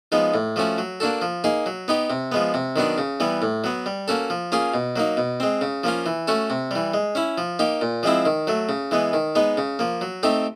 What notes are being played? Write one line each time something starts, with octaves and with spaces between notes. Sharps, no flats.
F3 G#3 B3 D#4
A2
F3 A3 C#4 F#4
F#3
A#3 D4 F#4 A4
F3
A#3 D#4 G#4
F#3
B3 D#4 G4
C3
F3 G#3 B3
C3
D#3 F#3 B3 D4
C#3
E3 G3 B3
A2
F#3 B3
G3
A#3 C#4 F#4 A4
F3
A#3 C#4 F4 G#4
B2
F#3 A#3 D#4
B2
G#3 C4
C#3
F3 A#3 C#4 F4
E3
A3 C#4 F#4 A4
C3
E3 G3
G#3
C#4 E4
F3
A#3 D#4 G4
A#2
F3 G#3 C4 E4
D#3
F#3 A3
C#3
E3 G#3 B3
D#3
G#3 B3 D#4
C#3
F3 A#3
F#3
A3 C4 D#4 G4